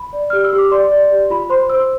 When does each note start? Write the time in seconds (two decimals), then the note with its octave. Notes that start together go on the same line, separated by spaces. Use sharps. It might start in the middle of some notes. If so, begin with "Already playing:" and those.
Already playing: B5
0.13 D5
0.30 G4 F6
0.44 E6
0.53 G4
0.58 D6
0.71 D5 C6
0.92 D5
1.11 G4
1.30 F4 B5
1.50 C5 C6
1.70 C5 E6